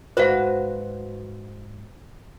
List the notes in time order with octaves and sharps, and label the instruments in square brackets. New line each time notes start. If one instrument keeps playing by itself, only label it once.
[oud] G#2 F#4 B4 [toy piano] C5 F5